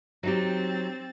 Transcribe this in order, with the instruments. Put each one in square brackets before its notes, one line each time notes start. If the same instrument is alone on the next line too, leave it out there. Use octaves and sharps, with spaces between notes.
[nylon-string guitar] F#3 D#4 G4 [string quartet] C4 A6